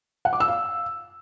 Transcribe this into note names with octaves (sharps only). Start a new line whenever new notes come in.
F#5
D6
E6
F5